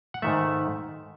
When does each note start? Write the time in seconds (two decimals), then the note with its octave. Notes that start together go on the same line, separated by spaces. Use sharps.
0.14 F#5
0.22 G#2 D#3 A3 E5